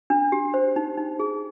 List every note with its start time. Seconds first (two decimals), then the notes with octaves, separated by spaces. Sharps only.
0.10 D4
0.32 G4
0.54 C5
0.76 D#4
0.98 D#4
1.19 G#4